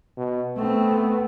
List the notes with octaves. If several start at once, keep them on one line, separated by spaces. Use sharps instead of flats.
B2
A3 B3 C4